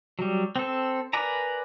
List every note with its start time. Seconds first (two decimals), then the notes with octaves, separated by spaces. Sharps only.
0.19 F#3 G3
0.56 C4 A4
1.13 A#4 B4 D5 G#5 A#5